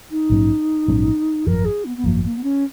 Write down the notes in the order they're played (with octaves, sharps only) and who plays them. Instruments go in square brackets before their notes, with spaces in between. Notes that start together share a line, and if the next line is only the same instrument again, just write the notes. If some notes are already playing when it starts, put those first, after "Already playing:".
[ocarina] D#4
[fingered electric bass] A#1 G#2 F#3 C#4
A#1 G#2 F#3 C#4
[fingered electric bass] G#1 F#2 F3 [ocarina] A#4
[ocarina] G#4
B3
B3
[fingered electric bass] G#1 F#2 F3 [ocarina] A#3
[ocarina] A#3
B3
C#4